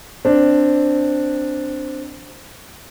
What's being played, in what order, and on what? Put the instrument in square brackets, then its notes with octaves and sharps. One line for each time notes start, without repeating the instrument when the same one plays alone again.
[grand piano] C4 D4